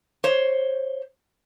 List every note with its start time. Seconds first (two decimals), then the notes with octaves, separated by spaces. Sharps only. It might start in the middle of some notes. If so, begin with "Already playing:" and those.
0.24 C5 C#5